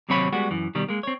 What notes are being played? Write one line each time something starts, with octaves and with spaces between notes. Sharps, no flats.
D#2 C3 F#3 C4 C#5 B5
G3 G#3 B3 F#4
F#2 E3
B2 D#3 G3
G#3 A#3
C4 C#5